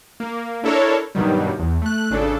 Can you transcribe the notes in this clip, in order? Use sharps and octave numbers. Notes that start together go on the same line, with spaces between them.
A#3
D4 E4 A4 A#4 C#5
G2 B2 D#3 F#3 G3
E2
A3 F#6
G#1 C#3 D4 A4